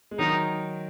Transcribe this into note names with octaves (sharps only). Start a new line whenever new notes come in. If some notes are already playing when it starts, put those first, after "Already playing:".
G#3
D#3 F#3 D#4